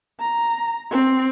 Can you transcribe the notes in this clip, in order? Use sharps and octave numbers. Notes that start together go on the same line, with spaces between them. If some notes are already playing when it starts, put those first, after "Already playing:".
A#5
C4